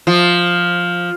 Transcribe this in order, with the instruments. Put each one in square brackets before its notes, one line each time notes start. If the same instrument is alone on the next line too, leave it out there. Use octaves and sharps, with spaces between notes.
[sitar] F3